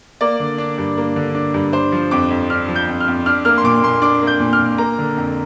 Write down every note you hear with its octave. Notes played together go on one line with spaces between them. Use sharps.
A#3 D5
D3
D4
G2
A#3
D3
D4
G2
D4 C5
F3
F2 D6
F2
D4 F6
F3
G6
F2
F6
F2
D4 F6
A#3 F6
C6
A#2 D6
A#2 C6
D4 D6
A#3
G6
A#2
F6
A#2
A#3 A#5
D3
F2